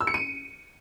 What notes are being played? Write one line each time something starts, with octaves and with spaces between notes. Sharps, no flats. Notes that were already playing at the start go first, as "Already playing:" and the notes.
E6
C#7
D#7